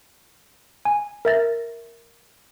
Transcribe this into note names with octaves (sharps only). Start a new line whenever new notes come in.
G#5
A#4 E5 A6 A#6